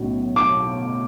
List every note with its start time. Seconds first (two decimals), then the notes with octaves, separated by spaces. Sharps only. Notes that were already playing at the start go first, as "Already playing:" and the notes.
Already playing: B1 A2 C#4
0.36 D6